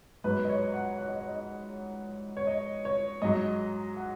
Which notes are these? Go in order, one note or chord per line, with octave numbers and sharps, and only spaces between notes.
G#2 F#3 B4
D#5
C#5
F#5
F#5
D#5
C#5
D#5
C#5
D#5
C#5
G#2 F#3 D#5
F#5